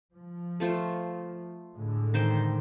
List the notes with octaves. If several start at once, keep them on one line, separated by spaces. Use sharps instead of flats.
F3
A3 F4 C5
A2 D3 G#3
D#3 C5 G5